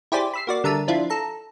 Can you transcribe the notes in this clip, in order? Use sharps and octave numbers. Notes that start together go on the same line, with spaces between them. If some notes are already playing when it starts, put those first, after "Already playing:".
E4 G4 G#4 C5 D5
B5 E6 C7
A#3 F#4 D5
D3 G3 A#4 E5 A5 D#7
F3 D4 E4 F4
A4 A#5